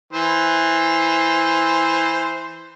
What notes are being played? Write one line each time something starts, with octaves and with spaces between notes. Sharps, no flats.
E3 C5